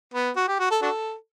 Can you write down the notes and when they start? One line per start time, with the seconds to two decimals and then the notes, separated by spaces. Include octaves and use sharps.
0.14 B3
0.36 F#4
0.47 G4
0.59 F#4
0.71 A4
0.82 D4 F#4 A4